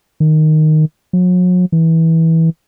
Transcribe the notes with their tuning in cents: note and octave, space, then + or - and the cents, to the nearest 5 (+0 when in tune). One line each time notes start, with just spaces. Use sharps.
D#3 -5
F#3 -40
E3 -20